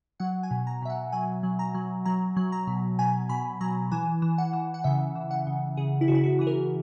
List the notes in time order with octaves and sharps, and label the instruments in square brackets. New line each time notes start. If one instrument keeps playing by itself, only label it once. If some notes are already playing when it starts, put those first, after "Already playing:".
[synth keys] F#3 F#5
G#5
B2
A#5
B2 E5
F#5
F#3 G#5
F#3
A#5
F#3
F#3 A#5
F#3
A#5
B2
B2 G#5
B2 B5
F#3 A#5
E3 G#5
E3
F#5
E3
F#5
C#3 E5
E3
F#5
C#3
C#3 G#4
E4
C#3 F#4
E4
F#4
E3 G#4
A#4